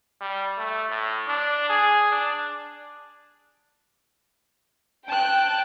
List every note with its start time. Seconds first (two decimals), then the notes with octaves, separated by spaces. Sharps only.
0.21 G3
0.58 A3
0.89 A2
1.28 D4
1.69 G#4
2.12 D4
5.09 G5 A5 F#6